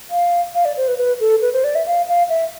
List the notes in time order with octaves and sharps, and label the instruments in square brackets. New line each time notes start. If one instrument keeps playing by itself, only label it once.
[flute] F5
F5
D5
C5
B4
B4
A4
B4
C5
D5
E5
F5
F5
E5